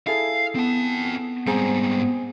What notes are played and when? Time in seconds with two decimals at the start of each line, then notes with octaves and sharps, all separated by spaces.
0.07 E4 G#4 A4 F5
0.55 B3 C4 A5
1.47 G#2 G3 C4 G#4 A#5